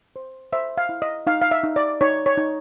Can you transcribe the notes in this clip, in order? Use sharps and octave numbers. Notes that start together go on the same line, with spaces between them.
C5
C5 E5
F5
E4
D#5
D#4 F5
F5
E5
D#4
D5
D#4 C#5
C#5
D#4